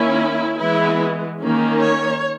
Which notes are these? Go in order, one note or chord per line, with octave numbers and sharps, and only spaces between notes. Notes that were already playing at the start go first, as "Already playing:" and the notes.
Already playing: D#3 A#3 C#4 E4
E3 G#3 B3 E4
D#3 A#3 C#4
C#5